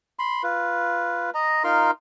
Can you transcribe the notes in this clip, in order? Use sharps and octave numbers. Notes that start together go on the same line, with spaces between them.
B5 C6
F4 B4
D#5 A#5
D#4 F4 A#4 C6